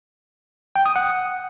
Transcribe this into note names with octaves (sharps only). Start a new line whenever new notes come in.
G5
D#6
F#5